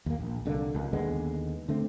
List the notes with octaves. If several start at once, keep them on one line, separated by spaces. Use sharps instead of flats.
D#2 A#3
A#1
C2 D3 G3 A#3
C#2
D#2 D3 G#3 B3
D3 A3 C4